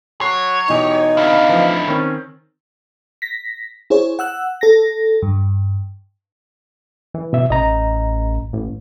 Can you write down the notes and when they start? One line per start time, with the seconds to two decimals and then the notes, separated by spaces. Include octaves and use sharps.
0.21 F#3 C#5 C6 C7
0.70 B2 E3 D#4 G4 G#5
1.17 D4 E4 F5
1.49 E3 F3
1.88 D#3 C4 C#4
3.22 A#6 B6
3.90 E4 G#4 C5 C#5
4.19 F#5 E6 F#6
4.61 A4 A#6
5.22 G2
7.14 E3
7.33 B2 E5
7.50 A1 D#5 A#5
8.53 A1